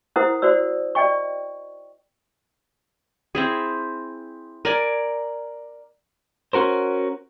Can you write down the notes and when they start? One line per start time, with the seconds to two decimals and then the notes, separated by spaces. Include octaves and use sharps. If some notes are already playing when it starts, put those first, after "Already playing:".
0.16 E4 A#4 C5 F#5 D#6
0.42 F#4 C5 D5 E6
0.95 D5 D#5 G5 C#6
3.35 C4 E4 G#4
4.65 A#4 D5 G#5
6.53 C#4 F#4 A#4 C5